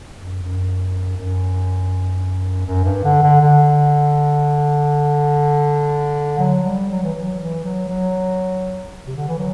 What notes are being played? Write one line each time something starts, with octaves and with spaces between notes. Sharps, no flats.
F#2
F#2
F#2
F#2
G2
D3
D3
D3
F#3
G3
F#3
E3
F#3
E3
F#3
F#3
C3
D3
E3
F#3